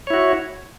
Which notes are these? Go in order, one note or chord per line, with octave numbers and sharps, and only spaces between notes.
E4 F#4 C#5